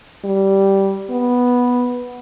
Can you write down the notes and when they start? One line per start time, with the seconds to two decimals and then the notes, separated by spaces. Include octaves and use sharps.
0.25 G3
1.11 B3